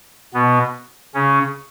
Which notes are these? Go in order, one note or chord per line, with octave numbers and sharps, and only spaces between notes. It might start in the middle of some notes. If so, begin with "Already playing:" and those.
B2 B3
C#3 C#4